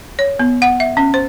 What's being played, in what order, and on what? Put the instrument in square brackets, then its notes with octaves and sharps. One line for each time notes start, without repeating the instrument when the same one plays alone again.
[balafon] C#5
B3
F#5
E5
C#4
C5